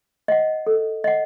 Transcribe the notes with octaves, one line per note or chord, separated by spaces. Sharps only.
D#5 F#5
A4
D#5 F#5